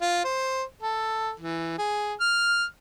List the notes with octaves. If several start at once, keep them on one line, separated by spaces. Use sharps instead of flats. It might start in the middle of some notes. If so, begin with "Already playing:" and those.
F4
C5
A4
E3
G#4
F6